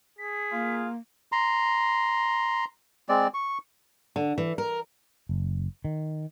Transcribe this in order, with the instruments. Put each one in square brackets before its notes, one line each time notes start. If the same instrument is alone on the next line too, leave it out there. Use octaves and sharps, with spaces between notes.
[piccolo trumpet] G#4 [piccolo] B6
[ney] A#3 [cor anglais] F4
[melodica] A#5 C6
G#3 C4 D5
C#6
[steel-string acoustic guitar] D3
E3
A#4
[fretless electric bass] F#1
D#3